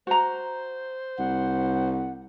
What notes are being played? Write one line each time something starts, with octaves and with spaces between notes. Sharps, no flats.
F#4 C5 A#5
C2 F#5